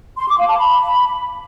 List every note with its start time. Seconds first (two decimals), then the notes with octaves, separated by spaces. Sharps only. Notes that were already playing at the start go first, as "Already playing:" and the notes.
0.18 C6
0.28 D6
0.38 F5
0.48 A5
0.58 B5